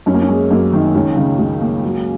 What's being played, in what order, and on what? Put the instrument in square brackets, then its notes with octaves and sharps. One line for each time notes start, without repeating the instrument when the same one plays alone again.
[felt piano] F#2 C#4
A#3
C#4
G#3
F#2 A#3
D#3
C#2 C#4
C#3
C#2
A#3
F#3